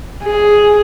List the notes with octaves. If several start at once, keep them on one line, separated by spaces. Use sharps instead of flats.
G#4